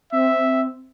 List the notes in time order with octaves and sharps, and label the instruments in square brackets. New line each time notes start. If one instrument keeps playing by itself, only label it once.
[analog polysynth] C4 [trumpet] E5